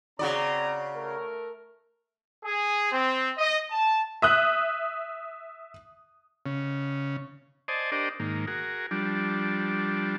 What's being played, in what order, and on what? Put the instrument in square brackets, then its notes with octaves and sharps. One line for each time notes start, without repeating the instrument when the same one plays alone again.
[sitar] C#3 F#4 D5 [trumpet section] C4 A#5
[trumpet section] A3 A#4
G#4
C4
D#5
A5
[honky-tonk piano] E5 D#6 F#6
[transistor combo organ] C#3
C5 D5 D#5 G#5 A5
D4 G4 A#4 C5 D5 D#5
G#2 D#3 A#3
F#4 G#4 A#4
F3 G3 D4